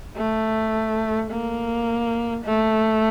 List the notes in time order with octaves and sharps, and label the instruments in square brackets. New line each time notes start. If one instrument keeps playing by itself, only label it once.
[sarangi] A3
A#3
A3